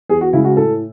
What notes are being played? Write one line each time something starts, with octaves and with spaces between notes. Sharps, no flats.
E2 G#4
F#4
C#3 G#3 E4
F#4
A2 A4